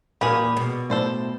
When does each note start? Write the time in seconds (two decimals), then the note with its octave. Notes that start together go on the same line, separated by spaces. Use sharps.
0.21 E2 A#2 A#3 G4 G#4 A#4 B5
0.57 B2
0.90 A2 A4 C5 D5